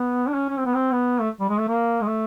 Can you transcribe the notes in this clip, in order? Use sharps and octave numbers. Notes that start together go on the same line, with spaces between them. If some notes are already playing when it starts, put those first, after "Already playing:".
Already playing: B3
D4
C#4
C#4
C4
B3
C4
B3
A3
G3
G#3
A3
A#3
G#3
A3